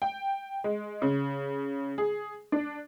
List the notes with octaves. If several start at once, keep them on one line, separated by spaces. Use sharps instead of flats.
G5
G#3
C#3
G#4
D4